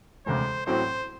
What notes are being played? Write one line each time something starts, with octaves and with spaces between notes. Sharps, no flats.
E1 D2 C3 C5
A1 A2 F#3 C4 C5